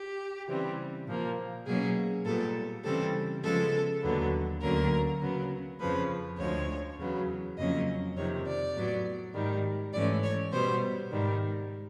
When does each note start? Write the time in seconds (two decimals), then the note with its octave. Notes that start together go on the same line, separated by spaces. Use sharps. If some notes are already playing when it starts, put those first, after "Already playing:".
Already playing: G4
0.48 C#3 E3 G3 C4
1.07 A#2 F3 A#3
1.66 B2 F#3 A#3 C#4 G#4
2.25 A#2 G3 B3 A4
2.84 C#3 E3 G3 C4 A4
3.43 C#3 F3 G#3 B3 A4
4.02 D#2 D3 F#3 B3
4.61 D2 D3 F#3 A#3 C#4 A#4
5.21 C#3 F#3 B3
5.80 F2 C#3 F3 B4
6.38 D2 D3 F3 G#3 C#5
6.98 E2 C#3 F#3 B3
7.58 F2 C#3 F#3 A#3 C#4 D#5
8.16 F2 C3 D#3 C#5
8.46 D5
8.76 A2 F#3 B3
9.34 G#2 D#3 G3
9.93 G#2 E3 A3 C#4 D5
10.23 C#5
10.52 B2 G3 B3 C5
11.11 G#2 D#3 G3